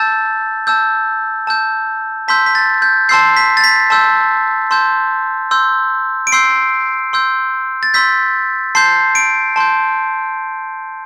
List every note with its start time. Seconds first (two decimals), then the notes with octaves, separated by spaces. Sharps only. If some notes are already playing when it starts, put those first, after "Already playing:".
Already playing: A5 E6 G6 A6
0.67 A5 E6 G6
1.47 A5 E6 G6
2.28 A5 C6 E6 G6 B6
2.46 B6
2.55 A6
2.82 G6
3.09 A5 C6 E6 G6 C7
3.37 B6
3.57 A6
3.64 B6
3.90 A5 C6 E6 G6
4.71 A5 C6 E6 G6
5.51 C6 E6 G6
6.27 D7
6.32 C6 E6 G6 C7
7.13 C6 E6 G6
7.83 A6
7.94 C6 E6 G6 B6
8.75 A5 C6 G6 C7
9.15 D7
9.56 A5 C6 G6